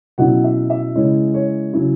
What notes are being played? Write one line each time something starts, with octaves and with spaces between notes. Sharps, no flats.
B2 F#3 C#4 E4 F#5
E5
E5
C#3 G#3 E4 C#5
C#5
C#3 F#3 C#4 E4